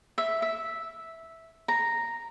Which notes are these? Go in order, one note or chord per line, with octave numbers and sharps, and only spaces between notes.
E5
E5
A#5